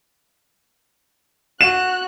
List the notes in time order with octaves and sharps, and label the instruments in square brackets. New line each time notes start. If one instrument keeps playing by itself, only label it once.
[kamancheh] F#4 F#6 [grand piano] E7